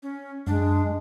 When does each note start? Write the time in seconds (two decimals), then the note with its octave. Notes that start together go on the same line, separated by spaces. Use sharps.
0.03 C#4
0.47 F#2 G#3 D4